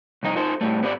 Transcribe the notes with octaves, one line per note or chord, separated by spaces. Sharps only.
C2 F2 D#4 D#5
D#4 F4 A4 C5
A2 G3 A3
G#2 B3 G4 B4 D5